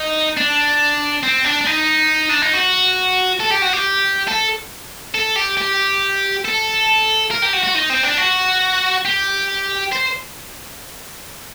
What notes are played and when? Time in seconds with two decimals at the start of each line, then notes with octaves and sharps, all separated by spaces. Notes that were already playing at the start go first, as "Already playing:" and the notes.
Already playing: D#4
0.37 D4
1.23 C4
1.45 D4
1.61 D4
1.66 D#4
2.29 D4
2.42 D#4
2.54 F#4
3.40 A4
3.52 G4
3.62 F#4
3.73 G4
4.28 A4
5.15 A4
5.36 G4
5.58 G4
6.45 A4
7.31 A#4
7.42 G4
7.53 F#4
7.63 F#4
7.75 D#4
7.90 C4
8.03 D4
8.17 F#4
9.05 G4
9.92 C5